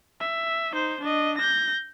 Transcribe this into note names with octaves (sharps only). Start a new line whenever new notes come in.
E5
D#4 C5
D4 D#5
G6 A#6